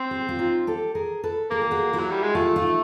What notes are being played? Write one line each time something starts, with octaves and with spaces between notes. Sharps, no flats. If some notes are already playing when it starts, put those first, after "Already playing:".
Already playing: C4
G4
G#4
F4 G4
D#4 F4
G4 A4
G#4 A#4
A4 B4
A#3 G#4
G4
F#4 G#4
E4 F#4
F#3
G3
G#3
A3 F4 G4
D#4 F4
F4